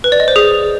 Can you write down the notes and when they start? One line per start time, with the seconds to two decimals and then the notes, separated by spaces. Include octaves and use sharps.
0.04 B4
0.12 D5
0.20 D#5
0.28 C5
0.36 G#4